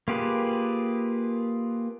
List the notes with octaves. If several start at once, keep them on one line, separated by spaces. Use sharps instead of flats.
A#3 F4 G4 G#4 B4